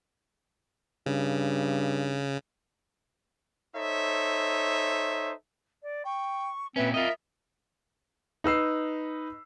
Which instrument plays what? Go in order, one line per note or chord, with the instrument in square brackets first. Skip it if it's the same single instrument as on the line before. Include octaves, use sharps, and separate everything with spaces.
[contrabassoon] G2 [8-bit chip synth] C#3
[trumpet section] D#4 A4 C5 C#5 E5
[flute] D5
[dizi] G5 [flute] C#6
[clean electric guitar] A#2 C#4 [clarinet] C4 [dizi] B4 [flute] E5
[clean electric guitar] F4 D#5 [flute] A#4 [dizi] E5
[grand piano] D#4 B4 E6 C7